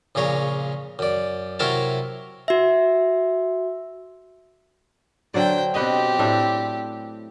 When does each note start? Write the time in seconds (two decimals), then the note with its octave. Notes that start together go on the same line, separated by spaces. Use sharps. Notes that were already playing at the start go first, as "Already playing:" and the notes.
0.15 A#1 A#2 C#3 C#5 A#5
0.99 F#2 D5
1.59 C3 F#3 E4 A#4 C#5 A5
2.48 F#4 E5
5.34 D3 F#3 C5 D5 G5
5.74 B2 C4 G4 B4 D#5
6.19 A2 D4 E5